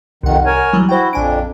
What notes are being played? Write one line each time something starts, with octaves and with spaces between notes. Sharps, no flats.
C2 F2 D#3 F#5
A#4 C#5 G#5
E3 F#3 G3
E4 F#4 C5 G5
A#1 F2 D4 G#5 D7